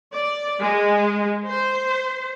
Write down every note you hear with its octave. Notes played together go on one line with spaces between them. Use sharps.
D5
G#3
C5